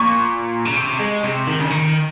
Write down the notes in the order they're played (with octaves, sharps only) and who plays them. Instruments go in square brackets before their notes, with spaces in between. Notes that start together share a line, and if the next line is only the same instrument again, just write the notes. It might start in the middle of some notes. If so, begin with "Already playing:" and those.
Already playing: [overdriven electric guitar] A#2 [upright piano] C#6
[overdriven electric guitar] C#3
C3
G#3
C3
D#3
C#3
D#3